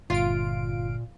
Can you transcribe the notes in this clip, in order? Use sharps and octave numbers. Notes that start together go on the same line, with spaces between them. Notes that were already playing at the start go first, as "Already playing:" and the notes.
G1 A#2 F4 F5 D7